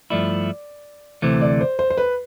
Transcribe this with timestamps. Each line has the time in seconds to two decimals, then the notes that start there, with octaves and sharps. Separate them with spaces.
0.10 G2 F3 A3 E4 D5
1.22 D2 C3 E3 A3 C5
1.41 D5
1.61 C5
1.79 C5
1.90 C5
1.97 B4